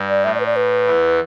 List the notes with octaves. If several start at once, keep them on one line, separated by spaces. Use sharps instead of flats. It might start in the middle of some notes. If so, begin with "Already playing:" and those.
Already playing: G2
D5
A2 E5
D5
B4
D5
B4
E2 E3